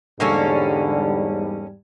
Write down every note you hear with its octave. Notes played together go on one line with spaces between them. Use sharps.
E2 G#2 D3 G3 A#3 C#4 A4